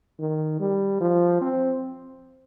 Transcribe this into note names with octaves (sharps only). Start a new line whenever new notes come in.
D#3
G3
F3
C4